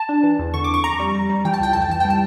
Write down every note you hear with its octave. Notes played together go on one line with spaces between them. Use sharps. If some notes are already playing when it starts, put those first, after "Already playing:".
Already playing: A5
D4
E3
E2
D3 C#6
D6
F2 C#6
F2 A#5
G3
G3
G3
E3 G5
A5
C#2 G5
F2 A5
G5
E3 A5
G5
G3
A5